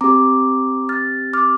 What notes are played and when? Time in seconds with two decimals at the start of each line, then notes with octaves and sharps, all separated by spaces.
0.01 C4 G4 A#5 D6
0.89 F6 A6
1.33 D6 F6